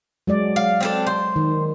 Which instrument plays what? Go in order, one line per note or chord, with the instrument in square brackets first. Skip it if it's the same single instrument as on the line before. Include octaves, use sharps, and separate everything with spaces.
[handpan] F#3 G#3 D5
[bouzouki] F5
C4 D4 A4
C5
[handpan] D#3